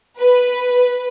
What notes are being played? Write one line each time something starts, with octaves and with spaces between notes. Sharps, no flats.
B4